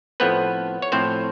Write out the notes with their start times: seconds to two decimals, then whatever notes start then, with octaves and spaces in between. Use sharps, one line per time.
0.20 A2 F3 A3 B3 C4 B4
0.82 C#5
0.92 A2 F3 A3 C4 C5